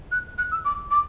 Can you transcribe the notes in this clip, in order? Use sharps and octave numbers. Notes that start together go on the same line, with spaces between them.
F#6
F#6
E6
D6
D6